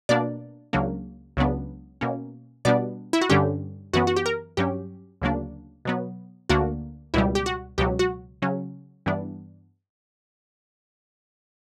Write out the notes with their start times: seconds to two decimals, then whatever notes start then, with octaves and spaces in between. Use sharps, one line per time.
0.09 B2 A#3 D4 D5
0.73 C#2 C#3 F#3 A#3 D4
1.37 C#2 C#3 F#3 B3 D4
2.01 B2 A#3 C#4
2.65 B2 G3 B3 D4 D5
3.13 E4
3.21 F#4
3.30 G2 D3 G3 C#4 G4
3.93 F#2 E3 B3 F#4
4.07 F#4
4.16 G4
4.26 A#4
4.57 G2 F#3 C#4 G4
5.22 D2 C#3 F#3 A#3 D4
5.85 B2 F#3 B3
6.49 D2 D3 A#3 D4 F#4
7.14 C#2 B2 G3 E4
7.35 G4
7.46 F#4
7.78 C#2 B2 F#3 G4
7.99 F#4
8.42 C#3 F#3 C#4
9.06 G2 E3 G3 B3 D4